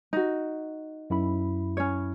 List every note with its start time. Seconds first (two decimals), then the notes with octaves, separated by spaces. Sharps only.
0.13 D#4 F#4
1.10 F#2 E4 B5
1.77 C#4 C#5